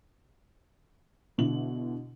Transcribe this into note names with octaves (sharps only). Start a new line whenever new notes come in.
B2 D3 E4 F#7